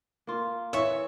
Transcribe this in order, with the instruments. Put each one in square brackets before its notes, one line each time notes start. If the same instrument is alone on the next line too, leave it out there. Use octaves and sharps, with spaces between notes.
[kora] A#3 F4
[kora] E3 [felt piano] C#5 [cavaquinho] E5 C#6